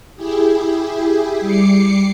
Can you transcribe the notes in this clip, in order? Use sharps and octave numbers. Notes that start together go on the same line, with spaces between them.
E4 G4 G#4
G3 D6 C7 C#7